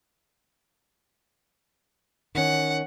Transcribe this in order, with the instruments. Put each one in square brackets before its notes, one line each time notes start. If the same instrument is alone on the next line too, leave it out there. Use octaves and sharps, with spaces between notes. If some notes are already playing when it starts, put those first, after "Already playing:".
[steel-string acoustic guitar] D#3 C#4 [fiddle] F#5